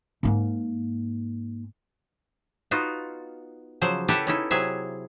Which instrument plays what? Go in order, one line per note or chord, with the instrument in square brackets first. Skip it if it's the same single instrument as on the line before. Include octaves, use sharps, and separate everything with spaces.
[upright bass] G#2 A#3
[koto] B3 D#4 F4 F#4
C#3 F3 F#3 C5
E4 G4 A4 B4 E5 F#5
C#4 D#4 E4
C3 F#3 G#4 E5